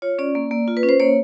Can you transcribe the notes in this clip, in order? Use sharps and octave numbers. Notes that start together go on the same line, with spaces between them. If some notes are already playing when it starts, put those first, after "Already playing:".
F4 C#5
C#4 D5
A#3
A#3
F4
B4
C#4
C5
A#3 C#5